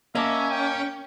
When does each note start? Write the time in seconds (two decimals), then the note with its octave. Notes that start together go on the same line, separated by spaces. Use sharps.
0.15 A#3 C#4 D#5 E5 A5 D6
0.50 G5